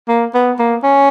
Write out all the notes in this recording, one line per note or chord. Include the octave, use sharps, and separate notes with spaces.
A#3
B3
A#3
C#4